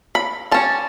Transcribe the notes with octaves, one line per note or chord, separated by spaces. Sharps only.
B5
G3 C#4 A5